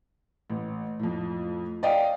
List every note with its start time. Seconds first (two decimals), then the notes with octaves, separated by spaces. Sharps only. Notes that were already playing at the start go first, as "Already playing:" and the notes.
0.50 A1
0.99 F2 A2
1.83 D5 D#5 F5 G5